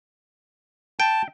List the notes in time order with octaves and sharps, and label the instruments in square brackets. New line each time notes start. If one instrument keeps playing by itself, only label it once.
[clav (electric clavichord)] G5 [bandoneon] A5